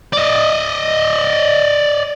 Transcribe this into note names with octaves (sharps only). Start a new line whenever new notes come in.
D5 D#5